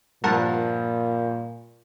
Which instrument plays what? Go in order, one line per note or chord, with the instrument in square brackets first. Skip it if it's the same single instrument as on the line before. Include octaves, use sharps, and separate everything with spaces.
[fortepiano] G2 F3 [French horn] A#2 [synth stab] A#4 F#5 A5